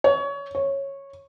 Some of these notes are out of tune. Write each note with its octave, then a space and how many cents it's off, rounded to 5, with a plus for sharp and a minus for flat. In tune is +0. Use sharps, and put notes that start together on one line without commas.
C#5 +25
C#5 -10